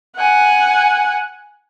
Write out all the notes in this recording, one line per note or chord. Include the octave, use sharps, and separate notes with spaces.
F#5 G#5